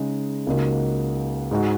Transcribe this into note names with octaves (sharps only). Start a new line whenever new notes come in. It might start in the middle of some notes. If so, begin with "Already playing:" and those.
Already playing: C#3 G#3 D#4
C#2 C#3 A#3 D#4 F#4
G#2 G#3 F#4